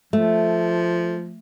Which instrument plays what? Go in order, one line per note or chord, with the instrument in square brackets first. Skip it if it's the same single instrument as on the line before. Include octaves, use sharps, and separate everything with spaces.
[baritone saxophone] F3 [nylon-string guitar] A3